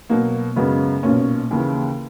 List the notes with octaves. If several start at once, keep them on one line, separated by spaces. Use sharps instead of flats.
B2 F#3 A#3
F#2 C#3 G#3 B3
B1 A#2 A#3 C#4
D#2 C#3 E3